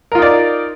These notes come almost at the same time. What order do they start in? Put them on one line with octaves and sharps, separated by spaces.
A#4 F4 D#4 D5